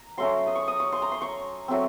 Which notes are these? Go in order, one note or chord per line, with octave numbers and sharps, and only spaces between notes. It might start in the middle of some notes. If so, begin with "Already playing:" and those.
Already playing: A#5
F#3 A3 C#4 C6
D#6
C#6
D#6
C#6
C6
A#5
C6
C#6
F#3 A3 C4